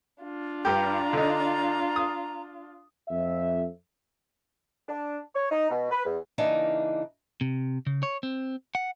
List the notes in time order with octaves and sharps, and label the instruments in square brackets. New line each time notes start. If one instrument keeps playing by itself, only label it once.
[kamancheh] D4 F4
[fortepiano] G2 G4 [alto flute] A#5
[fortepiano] D3 D#4
D#6
[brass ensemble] F2 E5
[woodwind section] D4
C#5
D#4
B2
B4
E2
[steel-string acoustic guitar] C#3 E3 A#3 D4 D#4
[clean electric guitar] C3
C#3
C#5
C4
F#5